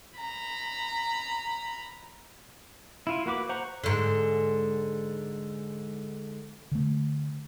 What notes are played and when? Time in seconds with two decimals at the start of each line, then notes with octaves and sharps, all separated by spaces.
0.18 A#5 B5
3.07 E4 F4
3.26 A#3 F#4 B4 D6
3.49 C5 F#5 A#5 C#6
3.84 G#2 D3
6.72 D3 A3